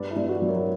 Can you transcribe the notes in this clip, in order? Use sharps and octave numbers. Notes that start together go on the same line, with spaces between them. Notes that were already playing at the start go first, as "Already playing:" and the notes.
Already playing: G2 B4 D5
E4
G2
F#4
F#3
A#4 C#5